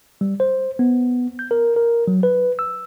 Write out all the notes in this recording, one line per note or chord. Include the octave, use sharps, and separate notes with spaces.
G3
C5
B3
G6
A#4
A#4
F#3
B4
E6